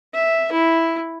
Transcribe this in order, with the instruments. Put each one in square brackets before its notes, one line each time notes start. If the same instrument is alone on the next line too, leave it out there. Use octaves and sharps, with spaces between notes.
[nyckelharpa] E5
E4